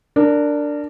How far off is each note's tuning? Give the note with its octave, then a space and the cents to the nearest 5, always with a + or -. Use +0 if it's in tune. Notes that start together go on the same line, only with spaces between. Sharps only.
D4 +0 A#4 -20